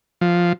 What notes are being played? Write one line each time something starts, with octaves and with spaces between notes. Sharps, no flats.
F3